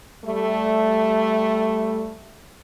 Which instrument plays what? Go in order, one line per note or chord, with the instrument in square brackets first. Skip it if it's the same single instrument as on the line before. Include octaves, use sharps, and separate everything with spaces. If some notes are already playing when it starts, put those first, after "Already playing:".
[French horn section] G3 A3